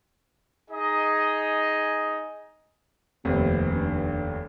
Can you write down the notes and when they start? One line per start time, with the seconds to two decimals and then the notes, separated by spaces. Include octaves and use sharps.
0.69 D#4 G#4 D#5
3.25 F1 D#2 C3 B3
3.74 G2